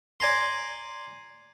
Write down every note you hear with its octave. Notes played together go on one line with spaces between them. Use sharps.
D5 G#5 A#5 C6